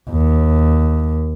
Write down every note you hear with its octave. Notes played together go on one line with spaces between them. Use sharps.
D#2